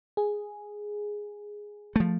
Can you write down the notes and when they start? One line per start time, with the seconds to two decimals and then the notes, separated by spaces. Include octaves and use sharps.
0.17 G#4
1.96 F3 A3